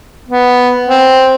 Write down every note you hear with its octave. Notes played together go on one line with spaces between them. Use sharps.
B3
C4